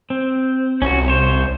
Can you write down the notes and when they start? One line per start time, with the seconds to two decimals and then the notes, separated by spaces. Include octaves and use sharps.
0.10 C4
0.82 C2 C#4 F#4
1.08 C5 C#5